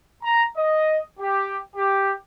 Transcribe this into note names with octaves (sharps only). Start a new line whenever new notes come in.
A#5
D#5
G4
G4